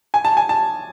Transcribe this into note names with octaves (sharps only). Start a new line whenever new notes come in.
G#5
A5
G#5
A5